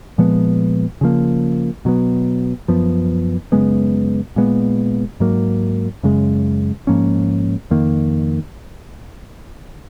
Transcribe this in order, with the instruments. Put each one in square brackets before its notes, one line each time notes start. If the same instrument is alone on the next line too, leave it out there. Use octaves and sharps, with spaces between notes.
[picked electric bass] A#2 F3 G#3 B3
C#3 F3 A#3
B2 F#3 B3
F#2 F3 B3
F#2 C#3 G#3 B3
A#2 G#3 B3
G#2 F#3 A#3
F#2 C#3 G#3
G#2 F3 A#3 C#4
F2 D#3 A#3